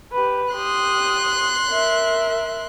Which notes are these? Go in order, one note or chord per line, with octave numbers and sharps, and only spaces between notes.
G4 B4
G4 C6 D#6 F#6
A#4 E5